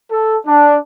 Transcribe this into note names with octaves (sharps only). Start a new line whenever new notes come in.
A4
D4